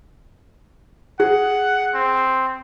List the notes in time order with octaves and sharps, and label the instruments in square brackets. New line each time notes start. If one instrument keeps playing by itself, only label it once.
[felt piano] G#4 [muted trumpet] F#5
[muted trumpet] C4